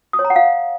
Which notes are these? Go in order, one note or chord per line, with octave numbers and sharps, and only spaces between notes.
D#6
C#5
A#5
F#5
F5